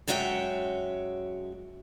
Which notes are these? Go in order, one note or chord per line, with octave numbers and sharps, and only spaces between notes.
F#2 G#3 F#4 C#5 E5 G5